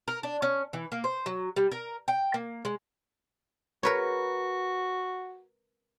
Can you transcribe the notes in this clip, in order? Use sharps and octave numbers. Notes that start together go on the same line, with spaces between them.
A#4
D4
C#4
E3
A#3
C5
F#3
G3
A#4
G5
A#3
G#3
F#4 A#4 B4 C#5